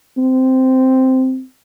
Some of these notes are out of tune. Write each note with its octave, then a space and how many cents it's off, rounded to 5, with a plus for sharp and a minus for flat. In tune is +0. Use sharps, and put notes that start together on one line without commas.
C4 -5